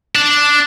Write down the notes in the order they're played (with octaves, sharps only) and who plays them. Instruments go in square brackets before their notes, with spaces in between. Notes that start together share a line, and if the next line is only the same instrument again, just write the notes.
[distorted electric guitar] D4